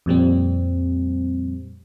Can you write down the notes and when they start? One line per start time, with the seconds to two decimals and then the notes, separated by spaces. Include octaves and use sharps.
0.06 F2 A#2 G3 C4